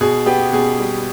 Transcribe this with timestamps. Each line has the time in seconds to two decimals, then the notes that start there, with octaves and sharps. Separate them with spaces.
0.01 B2 G#4
0.26 B3 G4
0.53 B2 G#4
0.79 G3